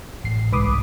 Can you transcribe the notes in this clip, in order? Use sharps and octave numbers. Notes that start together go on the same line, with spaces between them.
A1 C7
C2 G#2 B4 B5 D6 D#6